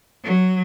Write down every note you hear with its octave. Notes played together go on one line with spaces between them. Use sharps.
F#3